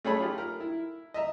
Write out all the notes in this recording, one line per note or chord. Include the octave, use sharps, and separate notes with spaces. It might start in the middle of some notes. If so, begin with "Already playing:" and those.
A3 C#4 G#4 A4 C#5 B5
F4 G4
A#4
E4
D#5 E5 A#5